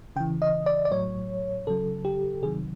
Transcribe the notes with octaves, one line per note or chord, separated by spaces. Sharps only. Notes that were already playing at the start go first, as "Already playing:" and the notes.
C#3 E3 G5
D#5
D5
D5
A2 F#3 C#5
C#3 F#3 A4
G4
C3 D#3 F#3 G#4